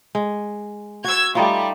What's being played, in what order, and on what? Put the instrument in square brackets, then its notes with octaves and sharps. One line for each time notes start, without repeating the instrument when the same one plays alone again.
[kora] G#3
[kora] F#4 [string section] E6 G#6
[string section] G3 [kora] A3 D#4 F4